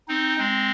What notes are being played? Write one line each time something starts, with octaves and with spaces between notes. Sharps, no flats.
C4 D#4
G#3 C4